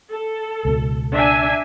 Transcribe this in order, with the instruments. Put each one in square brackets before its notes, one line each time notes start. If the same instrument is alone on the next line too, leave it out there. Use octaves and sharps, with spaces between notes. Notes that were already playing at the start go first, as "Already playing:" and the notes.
[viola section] A4
[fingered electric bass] C#2 B2
[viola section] D4 E5 G#5